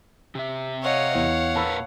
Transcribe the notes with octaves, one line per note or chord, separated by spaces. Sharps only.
C3 E5
C#5 D#5 F5 F#5
E2 C#5
A#2 A#4 B4 A5 B5 E6